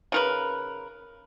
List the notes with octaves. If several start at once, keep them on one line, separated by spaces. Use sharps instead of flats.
C#3 A#4 B4